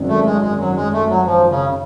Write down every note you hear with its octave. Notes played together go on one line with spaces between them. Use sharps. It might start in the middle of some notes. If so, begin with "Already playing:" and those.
Already playing: G#1 F#2 G#3
A3
G#3
G#3
F#3
G#3
A3
F#3
F3
C#3